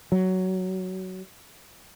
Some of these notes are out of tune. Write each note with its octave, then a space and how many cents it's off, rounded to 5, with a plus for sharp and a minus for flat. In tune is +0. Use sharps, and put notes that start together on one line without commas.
F#3 +10